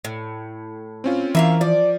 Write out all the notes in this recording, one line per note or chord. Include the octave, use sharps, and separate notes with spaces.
A2
C4 C#4 F4
E3 A#3 E5 F5
F3 D5